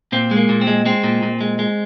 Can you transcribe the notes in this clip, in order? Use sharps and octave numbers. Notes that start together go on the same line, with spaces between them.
A#2 C4
G#3
A#3
A#2
C4
G#3
G#3 C4
A#2
A#2
G#3
G#3